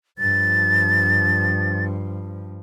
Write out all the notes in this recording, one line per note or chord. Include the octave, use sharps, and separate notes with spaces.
G2 F3 A6